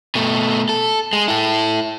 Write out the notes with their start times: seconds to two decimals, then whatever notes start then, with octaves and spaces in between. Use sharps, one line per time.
0.15 B2 A3
0.69 A4
1.13 G#3
1.28 E4 A4